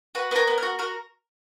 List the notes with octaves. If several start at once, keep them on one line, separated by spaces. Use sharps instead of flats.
F#4 B4
B3 A#4 B4 C#5
B3
F#4 A#4
F#4 A#4